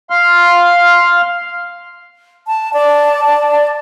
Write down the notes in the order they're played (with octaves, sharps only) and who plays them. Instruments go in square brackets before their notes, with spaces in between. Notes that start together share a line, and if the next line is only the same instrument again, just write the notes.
[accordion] F5 C6 F6
[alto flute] A5
[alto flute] D5 [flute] A5
[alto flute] D5